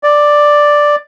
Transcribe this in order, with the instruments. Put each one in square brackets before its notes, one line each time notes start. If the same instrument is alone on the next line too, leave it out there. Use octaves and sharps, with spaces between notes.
[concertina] D5